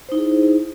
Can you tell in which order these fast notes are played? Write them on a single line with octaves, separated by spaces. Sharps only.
C5 D#4 E4 G#4